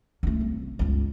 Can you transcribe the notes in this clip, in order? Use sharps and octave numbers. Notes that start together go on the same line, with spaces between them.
C#2 A3
C2
G1 C#2